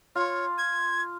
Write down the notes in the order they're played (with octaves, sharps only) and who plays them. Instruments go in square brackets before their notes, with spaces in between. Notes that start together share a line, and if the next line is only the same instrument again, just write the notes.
[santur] F4 [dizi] C#5
[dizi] G#6